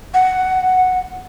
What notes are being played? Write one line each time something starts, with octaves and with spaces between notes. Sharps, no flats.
F#5